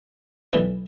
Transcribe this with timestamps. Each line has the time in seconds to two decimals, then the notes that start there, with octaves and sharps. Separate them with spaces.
0.53 B1 A2 E3 G3 B4